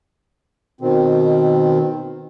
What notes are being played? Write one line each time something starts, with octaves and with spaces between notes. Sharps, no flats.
B2 D#3 C4